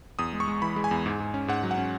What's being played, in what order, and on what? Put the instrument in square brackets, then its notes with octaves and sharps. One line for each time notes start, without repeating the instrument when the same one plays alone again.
[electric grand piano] E2 D#6
G#3
C#6
G#3
E3 B5
G#3
G#5
E2
G#2
G#2
C#4
G#2 F#5
F#3
F#5
C#4